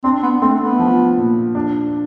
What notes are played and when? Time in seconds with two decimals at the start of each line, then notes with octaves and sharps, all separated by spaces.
0.04 C4 D4
0.23 B3
0.41 A3 C4
0.61 B3
0.79 F3
1.17 A#2
1.55 D4